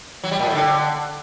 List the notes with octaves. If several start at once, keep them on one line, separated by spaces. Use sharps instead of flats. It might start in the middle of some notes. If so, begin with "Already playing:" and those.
F#3
G3
A#2
A2
D3